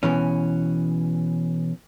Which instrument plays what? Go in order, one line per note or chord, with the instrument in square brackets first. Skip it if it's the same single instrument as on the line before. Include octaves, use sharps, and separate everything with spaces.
[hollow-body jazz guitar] B2 E3 C#4